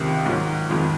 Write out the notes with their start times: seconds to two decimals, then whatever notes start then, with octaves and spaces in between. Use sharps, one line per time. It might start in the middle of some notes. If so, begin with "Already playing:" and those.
Already playing: C#2 C3 D#3
0.25 G#2 D#3 F#3
0.69 F2 D#3 G#3